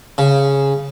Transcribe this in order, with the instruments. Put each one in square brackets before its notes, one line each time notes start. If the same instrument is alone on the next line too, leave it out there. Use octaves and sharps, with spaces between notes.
[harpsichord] C#3